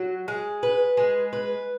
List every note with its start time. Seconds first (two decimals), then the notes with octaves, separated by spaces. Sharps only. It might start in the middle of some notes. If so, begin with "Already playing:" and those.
Already playing: F#3
0.28 G#3
0.63 B4
0.97 G#3
1.33 B4